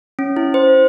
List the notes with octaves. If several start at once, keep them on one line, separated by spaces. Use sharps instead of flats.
C#4
E4
C5